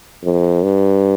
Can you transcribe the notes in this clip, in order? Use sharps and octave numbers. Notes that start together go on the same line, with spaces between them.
F2
G2